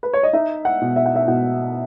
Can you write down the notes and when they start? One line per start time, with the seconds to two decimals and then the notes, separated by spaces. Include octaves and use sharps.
0.03 B4
0.13 C#5
0.23 D#5
0.33 D#4 E5
0.65 F#5
0.81 B2
0.96 E5
1.06 F#5
1.16 E5
1.28 B2 F#5